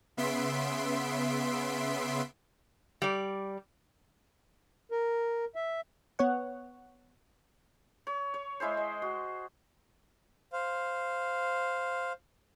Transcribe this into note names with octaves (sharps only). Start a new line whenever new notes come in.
C#3 B3 E5 C6 B6 D7
G3 D5
A#4
E5
B3 C#5 F#5
C#5
C#5
G#3 E4 G#4 C5
D#5
F#4
C5 F5